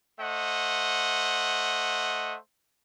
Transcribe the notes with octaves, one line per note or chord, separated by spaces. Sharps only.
A3 C5 D#5 F#5